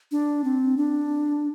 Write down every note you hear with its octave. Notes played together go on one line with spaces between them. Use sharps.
D4
C4
D4